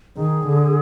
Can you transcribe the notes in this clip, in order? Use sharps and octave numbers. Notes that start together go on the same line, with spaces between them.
D#3 G#4
D3